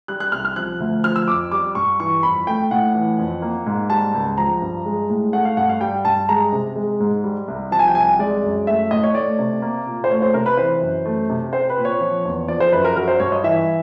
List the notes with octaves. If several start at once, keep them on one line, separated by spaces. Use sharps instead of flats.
G3 F#6
F#6
C2 F6
F6
F3 F#6
D2
F3 F6
E6
F2 D6
G3 D6
G2 C#6
E3 C#6
F2 B5
A3 G5
A2 F#5
E3
F2
A#3
G#2
G3 A5
C#2
F3 A#5
G2
G#3
A2
A3 F#5
F5
G2 F#5
F5
G3 G5
G2 A5
G#3 A#5
C3
G#3
G#2
G3
C2
F3 A5
G#5
G5
C2 G#5
G#3 D5
F#2
A3 E5
A2 D#5
C#5
A3 D5
C3
A#3
A#2
C5
A3 C#5
C5
C3 A#4
B4
E3 C5
F#2
A3
C3
C4 C5
B4
A#2
C#5
F3
E2
F3 D5
C5
F#2 B4
A#4
F#3 A#4
C5
G2 C#5
D#5
E3 E5